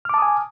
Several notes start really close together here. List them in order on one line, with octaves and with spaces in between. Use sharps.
F6 D6 A5 D#6 G#5